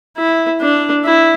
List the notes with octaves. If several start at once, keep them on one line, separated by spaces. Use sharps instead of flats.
E4
D4
E4